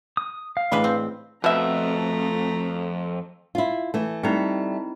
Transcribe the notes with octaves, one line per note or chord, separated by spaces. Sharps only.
D#6
F5
A2 E3 G#3 D4 B4 B5
C4
F2 B2 A3 E5 A#5
E4 F4
E3 A3
G3 A3 C4 D#4 E4